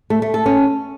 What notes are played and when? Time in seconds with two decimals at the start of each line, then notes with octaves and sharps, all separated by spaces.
0.10 A3
0.22 A3
0.34 A4
0.46 C#4